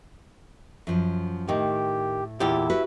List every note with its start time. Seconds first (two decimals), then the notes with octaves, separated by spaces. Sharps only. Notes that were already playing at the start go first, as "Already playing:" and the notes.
0.87 F#2 F3
1.49 A2 D#3 G4
2.40 E2 A#2 E4 G4 E5
2.70 F#4 G4 B4